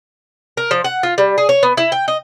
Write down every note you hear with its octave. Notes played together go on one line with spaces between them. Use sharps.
A#4
F3
F#5
F4
G3
G#4
C#5
B3
E4
G5
D#5